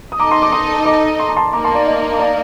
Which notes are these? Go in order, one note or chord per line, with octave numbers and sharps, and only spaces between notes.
D#6
D#4 A4 D#5 A#5 D6
C6
D6
C6 D#6
A#5 D6
C6
A#5
A5 C6
A#3 D#4 A#4 A#5 D6
A5 C6
D5
D#5
D5 F5